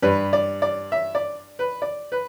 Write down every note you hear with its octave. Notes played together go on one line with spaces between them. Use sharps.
G2 G3 B4
D5
D5
E5
D5
B4
D5
B4